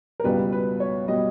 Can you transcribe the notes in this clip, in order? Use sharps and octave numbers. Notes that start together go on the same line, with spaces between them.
A#4
C#2 B2 G3 B4
B4
C#5
B2 G3 D#5